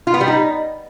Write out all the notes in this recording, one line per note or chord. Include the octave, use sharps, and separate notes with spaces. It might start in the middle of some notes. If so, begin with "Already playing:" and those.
F4
B3
G3
D#4